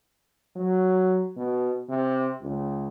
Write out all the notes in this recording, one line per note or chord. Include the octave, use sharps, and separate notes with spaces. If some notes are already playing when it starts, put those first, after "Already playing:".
F#3
B2
C3
C#2